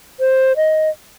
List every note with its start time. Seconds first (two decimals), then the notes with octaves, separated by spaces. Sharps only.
0.20 C5
0.56 D#5